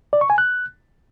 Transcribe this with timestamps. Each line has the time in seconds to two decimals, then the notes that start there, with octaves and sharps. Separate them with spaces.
0.13 D5
0.21 C#6
0.30 G#5
0.38 F#6